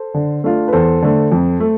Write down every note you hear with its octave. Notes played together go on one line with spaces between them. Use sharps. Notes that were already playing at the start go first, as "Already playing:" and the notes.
Already playing: A4 C5
D3
A3 D4 F4
B4
E2 A4 C5
D3 A3
F2
A3